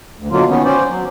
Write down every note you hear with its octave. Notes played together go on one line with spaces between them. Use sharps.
D2
B2 D3 F#3 A#3 F4
D#3 B3 C#4
C#4 C5 D5
F#3